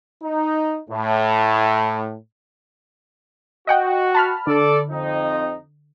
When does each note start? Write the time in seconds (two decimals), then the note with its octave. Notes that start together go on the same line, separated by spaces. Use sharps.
0.23 D#4
0.90 A2
3.67 F#4 D#5 F#5 G5
4.15 A5 B5 F6
4.47 D3 A4 D5
4.90 F2 C4 D#4